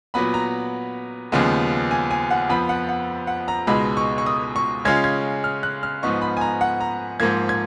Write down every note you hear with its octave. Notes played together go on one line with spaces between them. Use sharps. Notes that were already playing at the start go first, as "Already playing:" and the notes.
A#2 F#3 B3 B5
A#5
D#2 C#3 F3 G#3 B3
G#5
G#5
F#5
F2 F3 B3 B5
F#5
F#5
F#5
A#5
C#2 B2 G#3 D#4 B5
C#6
C#6
D#6
C#6
C#3 G#3 C#4 F4 G#6
G#6
F6
F#6
F6
G#2 F3 B3 D#4 C#6
B5
G#5
A#5
F#5
A#5
G#2 F3 A#3 G#6
G#6